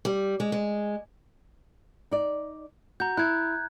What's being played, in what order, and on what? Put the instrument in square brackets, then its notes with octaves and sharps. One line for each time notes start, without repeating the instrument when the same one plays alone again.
[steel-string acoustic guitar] G3
G#3
G#3
[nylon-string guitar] D#4 D5
[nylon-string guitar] F#4 [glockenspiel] A#5 G6
[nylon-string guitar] E4 [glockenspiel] F#6 G#6